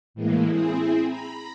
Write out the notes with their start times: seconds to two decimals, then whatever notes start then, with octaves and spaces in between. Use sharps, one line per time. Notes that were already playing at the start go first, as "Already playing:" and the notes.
0.14 A2 E3 G#3 A#3
0.49 C4 E4 G#4
1.06 A#5 B5